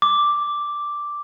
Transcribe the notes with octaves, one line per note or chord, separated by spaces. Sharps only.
D6